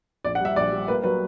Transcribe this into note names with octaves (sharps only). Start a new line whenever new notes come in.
A#1 D5
F#5
G3 E5
A#1 D5
G3
A#3 B4
F#3 B4